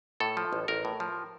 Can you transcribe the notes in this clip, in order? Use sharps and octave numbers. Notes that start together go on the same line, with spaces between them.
A2 A4
F3
A1
A1 A#4
A2
F3